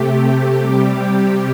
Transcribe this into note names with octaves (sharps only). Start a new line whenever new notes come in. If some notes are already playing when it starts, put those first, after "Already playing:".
Already playing: C3 A3 G4
C3 G3 G4